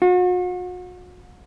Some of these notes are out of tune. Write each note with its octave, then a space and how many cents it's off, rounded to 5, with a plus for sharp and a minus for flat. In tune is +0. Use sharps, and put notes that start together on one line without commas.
F#4 -40